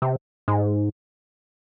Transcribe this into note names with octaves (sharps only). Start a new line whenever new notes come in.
C3
G#2